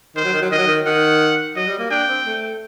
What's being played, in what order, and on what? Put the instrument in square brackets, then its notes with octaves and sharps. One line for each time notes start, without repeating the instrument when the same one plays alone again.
[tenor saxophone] D#3 [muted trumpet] C5
[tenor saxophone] F#3
D#3
F#3
[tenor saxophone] D#3 [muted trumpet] D#5
[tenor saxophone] F#3
D#3
[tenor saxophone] D#3 [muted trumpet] F#5
[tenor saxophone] F#3 [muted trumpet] D#5
[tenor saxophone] G3
A#3
[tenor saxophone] D4 [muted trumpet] G5
[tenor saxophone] C4
A3